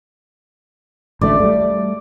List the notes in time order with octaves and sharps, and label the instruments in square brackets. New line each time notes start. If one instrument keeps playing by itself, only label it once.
[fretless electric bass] A1 D2 A3 [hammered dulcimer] D5
[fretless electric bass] G3 A3